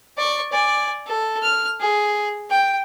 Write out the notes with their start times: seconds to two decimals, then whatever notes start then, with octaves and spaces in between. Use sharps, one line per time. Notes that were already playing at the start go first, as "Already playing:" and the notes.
0.17 D5 C#6
0.52 D5 G#5
1.07 A4
1.43 F6
1.80 G#4
2.50 G5